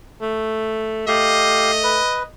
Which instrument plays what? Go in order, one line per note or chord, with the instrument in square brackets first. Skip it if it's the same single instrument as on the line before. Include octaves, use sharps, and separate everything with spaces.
[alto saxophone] A3
[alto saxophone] A3 [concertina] G4 F5 [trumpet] D#5
[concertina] B4